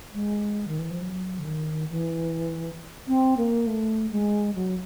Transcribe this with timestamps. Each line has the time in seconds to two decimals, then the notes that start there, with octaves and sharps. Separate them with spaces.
0.14 G#3
0.68 D#3
0.79 E3
0.91 F3
1.02 F#3
1.39 D3
1.45 D#3
1.90 E3
3.08 C4
3.37 A#3
3.67 A3
4.11 G#3
4.55 F#3